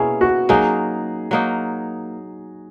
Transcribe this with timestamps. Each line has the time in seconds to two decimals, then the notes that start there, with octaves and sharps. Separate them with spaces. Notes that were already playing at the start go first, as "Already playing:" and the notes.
Already playing: B2 A#3 C#4 E4 G#4
0.21 F#4
0.49 F#3 A#3 D#4 G#4
1.31 F#3 A#3 D#4